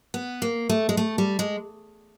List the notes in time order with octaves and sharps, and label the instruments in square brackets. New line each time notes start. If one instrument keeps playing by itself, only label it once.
[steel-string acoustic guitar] B3
A#3
A3
G#3
A3
G3
G#3